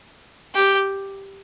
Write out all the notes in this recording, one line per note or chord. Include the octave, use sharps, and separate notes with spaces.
G4